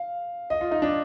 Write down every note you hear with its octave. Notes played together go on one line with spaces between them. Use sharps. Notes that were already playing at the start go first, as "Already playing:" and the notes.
Already playing: F5
D#5
F4
D#4
D4